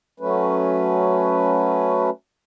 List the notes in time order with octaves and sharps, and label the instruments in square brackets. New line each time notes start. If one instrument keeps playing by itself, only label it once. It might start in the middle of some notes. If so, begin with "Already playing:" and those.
[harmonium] F#3 A3 C#4 B4